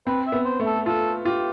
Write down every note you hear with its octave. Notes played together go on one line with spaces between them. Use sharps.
C4 B4
E5
B3
C5
A3
A4
F4 A4
F4 G4